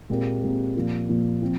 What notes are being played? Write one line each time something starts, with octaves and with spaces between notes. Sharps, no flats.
A#2 G#3 C4 G4 A#4
A#2 G#3 C4 G4 A#4
A#2 F3 A#3 F4
A#2 F3 A#3 F4
F3 C4 F4